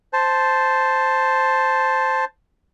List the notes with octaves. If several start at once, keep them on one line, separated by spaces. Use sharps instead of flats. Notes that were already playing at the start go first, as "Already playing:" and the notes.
C5 A5